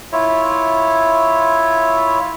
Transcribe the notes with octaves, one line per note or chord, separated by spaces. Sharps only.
E4 F4 C#5 E5